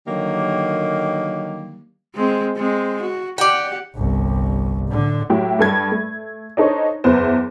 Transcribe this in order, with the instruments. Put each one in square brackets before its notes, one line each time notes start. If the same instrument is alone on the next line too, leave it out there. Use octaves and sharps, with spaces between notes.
[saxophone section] D3 D#3 F#3 G3 A#3
[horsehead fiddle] G#3 C4
G#3 C4
F#4
[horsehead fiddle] G4 F#5 [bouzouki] D5 G5
[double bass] G1 C2
A2 D3
[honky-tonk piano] A2 F#3 E4 G4
G2 A4 G#6
A3
D4 D#4 A4 C5 C#5
F#1 E2 E4 B4 C5